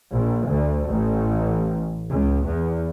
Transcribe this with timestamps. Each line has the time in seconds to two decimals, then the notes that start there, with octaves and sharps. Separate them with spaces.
0.13 A#1
0.48 D2
0.88 A1
2.10 C#2
2.47 E2